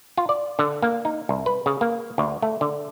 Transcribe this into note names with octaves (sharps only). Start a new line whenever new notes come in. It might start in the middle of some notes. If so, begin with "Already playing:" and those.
F4
D5
D3
A#3
D#4
C2
B4
C#3
A#3
D2
A3
D3